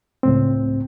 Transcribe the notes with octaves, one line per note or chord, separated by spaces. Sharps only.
C#2 A2 C4